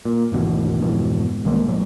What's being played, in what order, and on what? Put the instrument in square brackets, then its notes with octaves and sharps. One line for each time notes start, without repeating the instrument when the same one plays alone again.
[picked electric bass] A#2
G#1 D2 B2 E3
F2 G#2 B2 E3
C2 D#3 G#3 A#3
A#1 A2 F#3